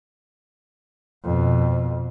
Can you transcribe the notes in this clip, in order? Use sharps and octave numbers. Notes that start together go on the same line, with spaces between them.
F2 B2